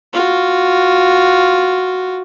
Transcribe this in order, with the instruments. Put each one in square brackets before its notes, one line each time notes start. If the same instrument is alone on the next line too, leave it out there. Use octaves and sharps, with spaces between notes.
[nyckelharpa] F4 F#4